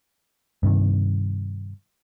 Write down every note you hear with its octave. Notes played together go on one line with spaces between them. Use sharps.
G2 C3 D#3